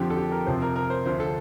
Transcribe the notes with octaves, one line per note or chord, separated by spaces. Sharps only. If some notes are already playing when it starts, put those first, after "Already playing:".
Already playing: F2 D3 F3 G4
A4
G4
A#4
F2 C3 F3 C5
A#4
A#4
C5
D2 D3 F3 C5
A4